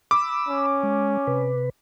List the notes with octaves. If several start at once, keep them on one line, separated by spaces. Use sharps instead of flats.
B5 D6 E6
C#4
G#3
C3 B4